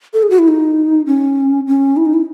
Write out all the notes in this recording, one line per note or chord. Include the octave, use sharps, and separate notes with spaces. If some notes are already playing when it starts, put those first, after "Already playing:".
A4
G#4
F#4
E4
D#4
C#4
C#4
E4
D#4
E4